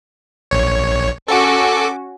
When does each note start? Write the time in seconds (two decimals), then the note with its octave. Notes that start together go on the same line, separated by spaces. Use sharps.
0.51 A#1 C#5
1.28 C#4 F#4 A4 D6